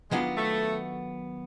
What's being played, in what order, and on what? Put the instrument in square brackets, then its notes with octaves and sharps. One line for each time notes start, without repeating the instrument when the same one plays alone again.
[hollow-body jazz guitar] D#3 F#3 B3 D4 F4 [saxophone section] G#3
[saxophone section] A3